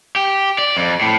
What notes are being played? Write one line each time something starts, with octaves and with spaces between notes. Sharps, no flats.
G4
D5
F2
A2